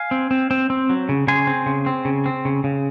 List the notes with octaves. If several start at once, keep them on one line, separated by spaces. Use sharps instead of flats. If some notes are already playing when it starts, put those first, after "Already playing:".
Already playing: F5 G#5
C4
C4
C4
C4
F#3
C#3
C#3 G#5 C6
C4
C#3
C4
C#3
C4
C#3
C#3